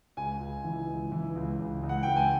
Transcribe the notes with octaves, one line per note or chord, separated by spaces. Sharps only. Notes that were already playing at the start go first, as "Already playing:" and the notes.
C#2 G#5
C#2
E3
C#2
E3
C#2
C#2
C#2
F#5
C#2 G5
G#5